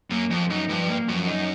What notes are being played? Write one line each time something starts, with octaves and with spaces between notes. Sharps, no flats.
F#2 A#3
F2 F3
F#2 D#4
G2 F3
A#3
F#2 F3
D#4